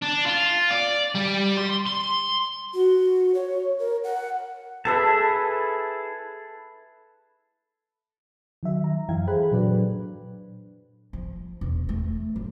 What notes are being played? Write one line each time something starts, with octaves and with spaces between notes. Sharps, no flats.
D4
F4
D5
G3
C6
C6
F#4
C#5
A#4
F#5
E4 G#4 A4 B4 E5 A5
D#3 F#3 E5
A#5
F#2 E3 E4 F5 G5 G#6
G#4 A4 C5 G5 B5 F#6
A#2 F#3 D4 B4 D5
F3
E1
A3
F#3